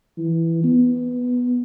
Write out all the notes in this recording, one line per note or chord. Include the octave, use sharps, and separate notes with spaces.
E3
B3